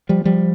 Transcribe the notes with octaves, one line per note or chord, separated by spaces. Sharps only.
F3 G3
F3 G3